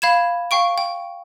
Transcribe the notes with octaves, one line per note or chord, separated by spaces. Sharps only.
F5 B5 G#6 E7
F5 G5 C#6 D7
G5